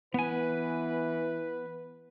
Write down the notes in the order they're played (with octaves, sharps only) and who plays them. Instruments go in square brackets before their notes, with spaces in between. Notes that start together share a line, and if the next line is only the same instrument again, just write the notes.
[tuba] E3 [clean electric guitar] B3 G#5 [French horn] B4